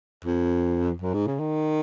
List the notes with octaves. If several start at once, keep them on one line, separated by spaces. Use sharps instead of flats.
F2
F#2
G#2
C#3
D#3